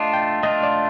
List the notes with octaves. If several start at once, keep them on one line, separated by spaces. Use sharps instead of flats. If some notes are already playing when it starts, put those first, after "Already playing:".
Already playing: A3 D4 F4 D#5
G5
A3 D4 F4 D#5
D5